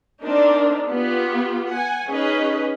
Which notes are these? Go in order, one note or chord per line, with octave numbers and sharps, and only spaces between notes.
C4 D4 D#4 A#4
B3 F4 G4
F#5 G#5
C#4 D#4 G#4 B4 D#5